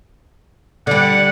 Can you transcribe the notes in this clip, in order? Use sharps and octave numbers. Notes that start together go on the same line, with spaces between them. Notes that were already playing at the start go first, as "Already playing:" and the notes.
D3 G3 F#5